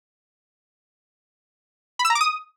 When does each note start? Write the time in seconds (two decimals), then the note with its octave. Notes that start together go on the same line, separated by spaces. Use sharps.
1.99 B5
2.05 E6
2.10 A#5
2.15 D6
2.21 D#6